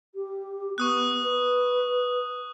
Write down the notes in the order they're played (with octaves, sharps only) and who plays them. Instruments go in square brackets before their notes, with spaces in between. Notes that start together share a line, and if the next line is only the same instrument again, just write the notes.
[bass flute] G4
[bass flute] B3 [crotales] C#6 D#6 F#6
[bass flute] B4